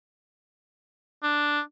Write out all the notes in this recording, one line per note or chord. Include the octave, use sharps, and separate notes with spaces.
D4